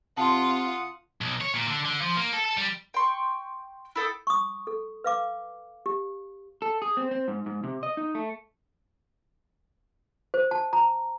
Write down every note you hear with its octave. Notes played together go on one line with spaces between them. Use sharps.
C3 F4 F#5 A5 C6 D#6
B1
C#5
A#2
D3
D3
F3
A#3
A4
A4
G3
G5 C6 C#6
E4 A4 G5 D#6
C#6 D#6
A4
B4 F5 D6
G4
A4
G#4
C4
C4
G#2
G#2
C3
D#5
D#4
A3
C5
A5
A#5